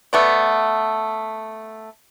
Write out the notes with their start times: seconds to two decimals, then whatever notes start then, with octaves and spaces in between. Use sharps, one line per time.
0.13 A3 B3 D5